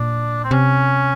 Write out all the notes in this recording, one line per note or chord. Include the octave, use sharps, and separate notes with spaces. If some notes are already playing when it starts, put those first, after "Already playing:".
Already playing: A#2 D4
C4
C3 C#4